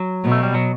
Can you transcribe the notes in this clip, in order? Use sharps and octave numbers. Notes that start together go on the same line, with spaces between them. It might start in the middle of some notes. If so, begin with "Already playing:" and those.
Already playing: F#3
B2
A3
G3
F#3